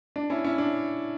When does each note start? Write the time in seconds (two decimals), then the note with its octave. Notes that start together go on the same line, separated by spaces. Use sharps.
0.16 D4
0.30 C#4 E4
0.44 C#4 E4
0.58 D4